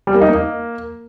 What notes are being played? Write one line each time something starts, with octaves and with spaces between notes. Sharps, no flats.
G3
A#3
D#4
A#3